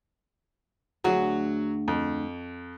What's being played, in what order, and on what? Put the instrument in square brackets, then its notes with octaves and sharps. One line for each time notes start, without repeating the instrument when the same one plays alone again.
[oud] D2 G#4 [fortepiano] F#3 F#4
[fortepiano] F2